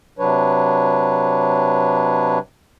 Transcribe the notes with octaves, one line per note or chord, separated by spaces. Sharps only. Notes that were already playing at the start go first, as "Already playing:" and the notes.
C3 F#3 D4 B4 C#5